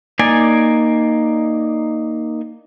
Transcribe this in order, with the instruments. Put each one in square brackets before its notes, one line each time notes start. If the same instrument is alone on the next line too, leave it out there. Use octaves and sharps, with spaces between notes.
[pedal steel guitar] A#3 D#4 D5 G#5